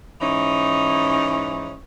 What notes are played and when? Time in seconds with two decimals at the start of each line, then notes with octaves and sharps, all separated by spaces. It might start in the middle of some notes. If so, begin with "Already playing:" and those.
0.20 G#2 E3 C#4 D#4